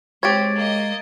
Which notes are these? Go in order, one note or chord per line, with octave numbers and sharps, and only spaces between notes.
G#3 C4 G4 C#5 G#6 A6 D7
A#3 D#5